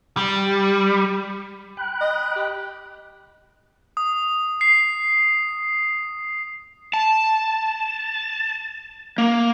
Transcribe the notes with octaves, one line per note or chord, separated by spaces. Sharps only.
G3
G5 B5 F#6
D#5
G4
D#6
C7
A5
A#3